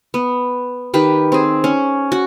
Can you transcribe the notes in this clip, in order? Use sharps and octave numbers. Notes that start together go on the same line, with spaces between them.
B3
D#3 G4 B4
C4 G#4
C#4
F#4